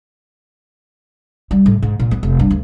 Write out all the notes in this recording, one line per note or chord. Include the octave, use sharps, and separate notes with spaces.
G3
A2
G#2
A#2
B3
F1
G2
D2